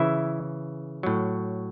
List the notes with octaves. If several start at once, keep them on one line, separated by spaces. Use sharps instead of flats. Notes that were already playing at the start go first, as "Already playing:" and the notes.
Already playing: C#3 E3 E4 E5
A2 F#3